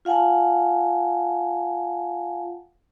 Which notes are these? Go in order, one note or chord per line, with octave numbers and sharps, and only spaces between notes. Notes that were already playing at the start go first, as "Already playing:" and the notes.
F4 F5 F#5 G#5 A5